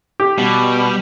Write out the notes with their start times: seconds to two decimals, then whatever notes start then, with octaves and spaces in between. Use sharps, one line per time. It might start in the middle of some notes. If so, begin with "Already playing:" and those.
0.20 G4
0.38 B2 G3